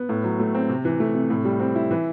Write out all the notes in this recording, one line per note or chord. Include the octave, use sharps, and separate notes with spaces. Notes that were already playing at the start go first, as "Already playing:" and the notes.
Already playing: B3
A2
F#3
A3
C4
C3
E3
A3
C3
A2
G3
C4
E4
E3